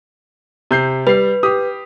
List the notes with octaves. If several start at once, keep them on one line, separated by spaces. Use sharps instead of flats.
C3 G6 C7
G3 B4 C7
G4 D#6